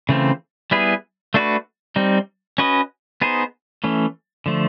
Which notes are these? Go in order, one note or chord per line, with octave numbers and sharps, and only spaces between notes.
C#3 E3 A3 C4 F4
G3 B3 E4 G#4 B4
A3 D4 F#4 B4
G3 C4 D#4
C#4 F#4 B4 D#5
B3 D#4 G#4 C5
E3 A3 C#4
D3 F3 A3